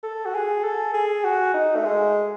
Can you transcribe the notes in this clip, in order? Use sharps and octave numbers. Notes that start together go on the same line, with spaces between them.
A4
F#4
G#4
A4
G#4
F#4
D#4
A3
G#3